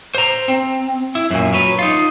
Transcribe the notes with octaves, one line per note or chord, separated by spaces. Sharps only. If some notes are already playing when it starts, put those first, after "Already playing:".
C5 A#5
C4
E4
F#2 A#2
F#3 B4
D#4 F4